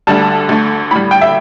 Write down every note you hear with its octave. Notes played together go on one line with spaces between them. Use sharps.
D2 D3 G3 A5
D2 D3 A3
A2 G3 B5
G5
E5